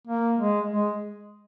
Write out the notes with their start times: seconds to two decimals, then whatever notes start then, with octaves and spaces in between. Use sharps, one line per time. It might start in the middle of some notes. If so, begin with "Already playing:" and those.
0.07 A#3
0.38 G#3
0.70 G#3